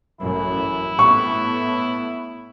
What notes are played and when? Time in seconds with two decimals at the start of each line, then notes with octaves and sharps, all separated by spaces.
0.20 A1 F#2 A2 E4
0.99 A2 A3 B3 C#6